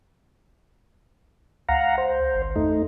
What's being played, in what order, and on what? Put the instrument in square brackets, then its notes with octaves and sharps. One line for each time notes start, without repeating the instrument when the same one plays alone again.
[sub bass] C#2 [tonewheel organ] F5 F#5 A#5
[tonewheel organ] C5
[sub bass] G#1
[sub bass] F2 [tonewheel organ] A3 D#4